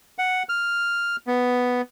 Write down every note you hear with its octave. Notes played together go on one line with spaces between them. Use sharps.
F#5
F6
B3